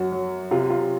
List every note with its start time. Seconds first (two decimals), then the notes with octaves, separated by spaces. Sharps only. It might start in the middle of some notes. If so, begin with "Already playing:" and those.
Already playing: F#2 F#4
0.12 F#3
0.51 C3 F4
0.70 F4